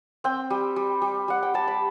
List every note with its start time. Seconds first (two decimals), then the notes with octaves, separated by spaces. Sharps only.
0.24 C4 G5
0.50 G3
0.76 G3
1.02 G3
1.28 G3 F#5
1.43 G5
1.54 G3 A5
1.68 B5